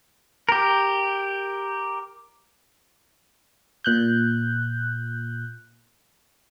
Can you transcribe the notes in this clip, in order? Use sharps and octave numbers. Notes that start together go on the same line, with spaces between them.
G4 A#4
A#2 F#6 G6